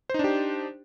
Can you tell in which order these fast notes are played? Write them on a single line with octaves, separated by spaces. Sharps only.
C5 D#4 D4 G4